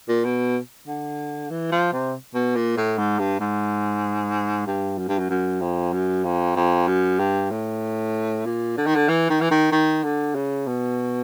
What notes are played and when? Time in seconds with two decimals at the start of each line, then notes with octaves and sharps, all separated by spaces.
0.08 A#2
0.24 B2
0.87 D3
1.50 E3
1.72 F3
1.93 C3
2.34 B2
2.55 A#2
2.77 A2
2.98 G#2
3.19 G2
3.40 G#2
4.67 G2
4.98 F#2
5.08 G2
5.19 F#2
5.30 F#2
5.61 F2
5.93 F#2
6.24 F2
6.56 F2
6.87 F#2
7.19 G2
7.51 A2
8.45 A#2
8.77 D3
8.86 D#3
8.95 D3
9.08 E3
9.30 D#3
9.41 E3
9.51 D#3
9.72 D#3
10.04 D3
10.35 C#3
10.66 B2